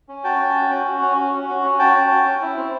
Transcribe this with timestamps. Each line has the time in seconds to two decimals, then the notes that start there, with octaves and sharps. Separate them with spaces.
0.09 C#4
0.24 F#4 G5 A5
0.40 C#4
0.55 F#4
0.71 C#4
0.87 F#4
1.02 C#4
1.17 F#4
1.33 C#4
1.49 F#4
1.64 C#4
1.79 F#4 G5 A5
1.95 C#4
2.10 F#4
2.26 C#4
2.42 E4
2.56 C4